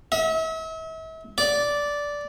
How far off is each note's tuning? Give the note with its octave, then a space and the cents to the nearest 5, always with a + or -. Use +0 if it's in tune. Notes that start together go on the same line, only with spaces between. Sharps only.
E5 -40
D5 -10